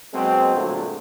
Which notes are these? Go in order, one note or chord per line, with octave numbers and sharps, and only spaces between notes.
B2 F#3 G#3 A#3 C4
G2 A#2 D3 F#3 G#3 A3